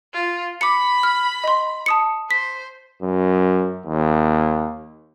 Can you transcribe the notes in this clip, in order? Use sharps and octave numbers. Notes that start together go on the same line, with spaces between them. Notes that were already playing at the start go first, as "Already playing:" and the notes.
F4
B5 D6 C#7
F6
D#5 C6
A5 D#6 C#7
C5 B6
F#2
D#2